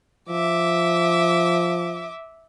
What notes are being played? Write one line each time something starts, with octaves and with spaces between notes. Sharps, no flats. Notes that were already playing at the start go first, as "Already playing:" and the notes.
F3 E5 D6